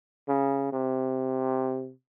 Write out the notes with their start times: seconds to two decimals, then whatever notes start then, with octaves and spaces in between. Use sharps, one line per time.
0.28 C#3
0.72 C3